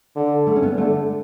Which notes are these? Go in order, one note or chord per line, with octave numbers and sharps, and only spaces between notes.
D3
A3
C#4
B3
D3 A3